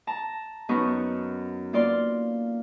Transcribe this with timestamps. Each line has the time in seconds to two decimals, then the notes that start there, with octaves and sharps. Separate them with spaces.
0.07 A5 A#5
0.69 F#2 B3 D#4 C#6
1.73 A#3 F4 D5 C6